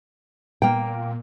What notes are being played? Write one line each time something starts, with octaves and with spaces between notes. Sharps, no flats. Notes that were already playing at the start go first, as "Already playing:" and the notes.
A#2 A#3 G5